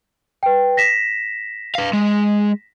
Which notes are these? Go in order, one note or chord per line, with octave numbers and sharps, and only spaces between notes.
B4 G5
A#6 B6 E7
B4 F5
G#3